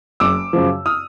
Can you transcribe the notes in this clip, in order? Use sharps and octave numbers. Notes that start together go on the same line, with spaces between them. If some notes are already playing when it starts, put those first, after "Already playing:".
F#1 D6 E6
F#2 C#3 F3
D#6 F6